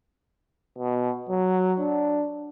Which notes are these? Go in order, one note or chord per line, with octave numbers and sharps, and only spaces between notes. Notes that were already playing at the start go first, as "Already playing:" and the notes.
B2
F#3
D4